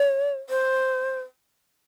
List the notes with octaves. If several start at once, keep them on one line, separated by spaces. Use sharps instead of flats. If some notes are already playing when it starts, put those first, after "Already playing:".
Already playing: C#5
C5